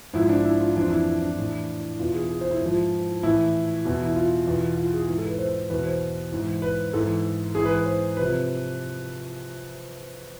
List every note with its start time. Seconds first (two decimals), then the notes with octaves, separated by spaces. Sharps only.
0.14 G#2 F3 E4
0.29 D4
0.45 E4
0.60 F4
0.76 F2 E3 D4
0.91 E4
1.06 E4
1.22 D4
1.38 A2 E3
1.99 E2 B2 F4
2.15 G#4
2.31 G#4
2.41 C5
2.51 E4
2.61 G#2 F3
3.23 A2 E3 E4
3.85 E2 B2
4.05 E4
4.16 F4
4.47 E2 B2
4.77 F4
4.93 G#4
5.08 G#2 E3
5.18 A4
5.28 B4
5.39 C5
5.70 E2 B2 B4
5.86 C5
6.32 G#2 E3
6.62 B4
6.93 G#2 E3 A4
7.55 G#2 E3 G#4
7.65 B4
7.76 B4
7.86 C5
8.17 C3 F3 B4